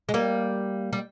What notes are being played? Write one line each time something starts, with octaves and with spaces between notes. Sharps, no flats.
G#3
G3 A#3
G3